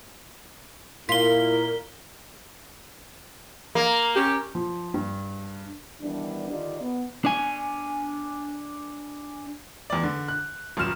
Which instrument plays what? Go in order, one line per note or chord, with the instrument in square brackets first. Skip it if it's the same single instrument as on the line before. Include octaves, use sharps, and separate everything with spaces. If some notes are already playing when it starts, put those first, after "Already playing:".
[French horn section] A#2 E4 [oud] F4 [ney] A#4 [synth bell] B6 G7
[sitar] A#3
[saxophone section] C#4 G4
[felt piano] F3
G2
[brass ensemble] D#3 E3 G3 B3 D4
D3 D#3 D#4 F4 G4 D5
B3
[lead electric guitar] D4 G#5
[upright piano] E2 D5
D3
F#6
D#1 F#2 F6 E7